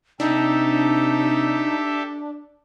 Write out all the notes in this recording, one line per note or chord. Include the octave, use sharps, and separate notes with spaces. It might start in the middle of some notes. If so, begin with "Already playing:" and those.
C3 D4 D#4 G4 A4 E5